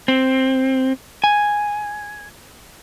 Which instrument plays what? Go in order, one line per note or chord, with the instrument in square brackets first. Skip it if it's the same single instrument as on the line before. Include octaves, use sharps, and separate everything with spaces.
[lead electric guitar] C4
G#5